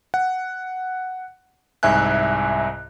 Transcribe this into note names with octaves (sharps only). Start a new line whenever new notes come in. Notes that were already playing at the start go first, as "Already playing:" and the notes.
F#5
C2 G#2 E5 G#5 F#6